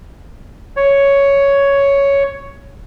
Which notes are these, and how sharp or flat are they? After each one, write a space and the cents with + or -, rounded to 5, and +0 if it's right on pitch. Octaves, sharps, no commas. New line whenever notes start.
C#5 +5